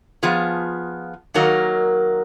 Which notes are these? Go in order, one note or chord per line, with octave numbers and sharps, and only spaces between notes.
F3 B3 F4 G#4
D#3 F#3 A#3 D#4 A#4